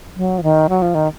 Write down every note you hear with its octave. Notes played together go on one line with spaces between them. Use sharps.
F#3
F3
D#3
F#3
F3
D#3